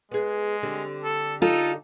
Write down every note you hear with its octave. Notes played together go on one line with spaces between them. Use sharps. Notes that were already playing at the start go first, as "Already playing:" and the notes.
G#3 B3 G#4
D3 G3 C4
A4
D#4 F4 A4